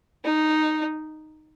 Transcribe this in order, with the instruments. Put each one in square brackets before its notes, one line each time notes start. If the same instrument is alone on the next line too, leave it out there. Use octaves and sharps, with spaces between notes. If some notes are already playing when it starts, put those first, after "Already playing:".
[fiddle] D#4